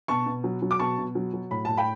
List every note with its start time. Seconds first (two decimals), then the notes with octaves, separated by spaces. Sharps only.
0.08 B2 A5 C#6
0.26 B2
0.44 F#3
0.62 F#3
0.71 D6
0.79 B2 A5 C#6
0.98 B2
1.15 F#3
1.33 F#3
1.51 A2 B5
1.65 A2 A5
1.77 G5 B5